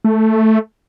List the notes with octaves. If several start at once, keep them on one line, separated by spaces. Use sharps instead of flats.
A3